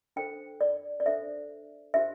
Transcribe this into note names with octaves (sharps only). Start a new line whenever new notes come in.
D4 A4 C5 G5
D5
D5
D4 A4 C5 E5
D4 G4 C5 E5